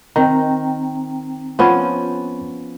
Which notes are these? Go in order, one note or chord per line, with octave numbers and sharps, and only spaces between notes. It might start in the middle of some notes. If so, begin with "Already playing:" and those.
D#3 C4 G5 A#5
F3 B3 C#4